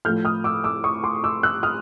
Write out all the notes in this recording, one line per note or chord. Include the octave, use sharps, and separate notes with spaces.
A2 F3 A3 F6 G6
D#6 F6
D6 E6
D6 E6
C#6 D#6
C6 D6
D6 E6
E6 F#6
D#6 F6